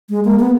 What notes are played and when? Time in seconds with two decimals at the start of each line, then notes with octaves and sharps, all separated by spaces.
0.10 G#3
0.25 A#3
0.39 B3